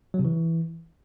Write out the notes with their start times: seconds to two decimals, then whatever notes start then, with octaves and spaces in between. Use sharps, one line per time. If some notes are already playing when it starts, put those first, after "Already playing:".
0.14 F#3
0.19 C3
0.25 E3